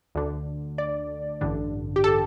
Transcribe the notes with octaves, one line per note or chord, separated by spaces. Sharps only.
D2 D3
D5
A1 G2 D3
G4
A4